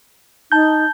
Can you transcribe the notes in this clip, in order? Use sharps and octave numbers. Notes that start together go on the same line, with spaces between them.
D#4 A5 G6